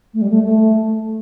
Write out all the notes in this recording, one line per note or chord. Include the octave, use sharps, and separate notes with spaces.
A3
G3
A3
A3